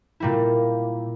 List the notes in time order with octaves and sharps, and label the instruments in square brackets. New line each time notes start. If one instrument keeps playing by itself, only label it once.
[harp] A#2 G3 A#3 E4